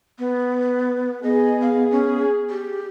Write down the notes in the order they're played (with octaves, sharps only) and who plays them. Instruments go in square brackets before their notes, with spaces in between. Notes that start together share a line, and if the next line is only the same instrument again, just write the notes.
[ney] B3
[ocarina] B3 [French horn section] G#4 [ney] D#5
[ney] F5
C#4
G4